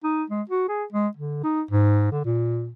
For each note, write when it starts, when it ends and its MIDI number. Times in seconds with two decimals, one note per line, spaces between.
0.04 0.24 63
0.30 0.42 56
0.49 0.64 66
0.69 0.84 68
0.92 1.08 56
1.17 1.42 50
1.44 1.62 63
1.71 2.10 44
2.12 2.22 50
2.25 2.72 46